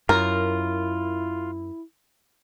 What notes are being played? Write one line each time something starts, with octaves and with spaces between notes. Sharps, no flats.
F#2 E4 F4 A#4